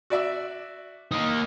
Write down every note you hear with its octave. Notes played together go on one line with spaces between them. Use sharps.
F#4 D5 E5
A#3 D#4